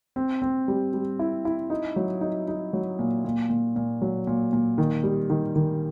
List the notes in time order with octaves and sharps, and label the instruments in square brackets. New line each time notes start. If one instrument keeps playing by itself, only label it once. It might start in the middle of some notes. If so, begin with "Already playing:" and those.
[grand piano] C4
C4
G3
G3
E4
E4
D#4
F#3
D#4
D#4
F#3
A#2
A#2
A#2
A#2
F#3
A#2
A#2
D#3
G3
D#3
D#3